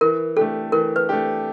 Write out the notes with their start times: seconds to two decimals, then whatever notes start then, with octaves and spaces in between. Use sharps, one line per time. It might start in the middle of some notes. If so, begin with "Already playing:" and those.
0.01 E3 A#4
0.37 A3 D4 G4 A4
0.72 E3 A#4
0.96 B4
1.09 A3 D4 G4